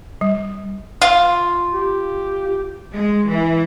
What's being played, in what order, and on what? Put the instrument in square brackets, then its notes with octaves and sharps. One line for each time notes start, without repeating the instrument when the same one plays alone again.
[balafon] G3
[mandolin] F4
[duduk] G4
[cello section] G#3
E3